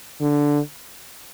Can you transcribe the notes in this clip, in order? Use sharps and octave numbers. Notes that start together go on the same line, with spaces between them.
D3